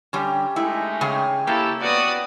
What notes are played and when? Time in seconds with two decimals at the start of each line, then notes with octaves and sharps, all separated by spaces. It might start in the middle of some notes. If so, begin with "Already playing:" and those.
0.13 D3 G3 C#4 G4 E5
0.56 G#3 A3 D#4 E4
1.01 C#3 G#4 C#5 G5
1.47 A#3 E4 G4 A4
1.82 B3 F#4 D5 D#6